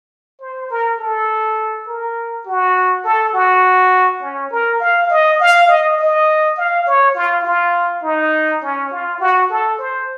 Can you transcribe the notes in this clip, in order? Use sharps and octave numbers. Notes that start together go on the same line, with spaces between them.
C5
A#4
A4
A#4
F#4
A4
F#4
C#4
A#4
F5
D#5
F5
D#5
D#5
F5
C#5
F4
F4
D#4
C#4
F4
F#4
A4
C5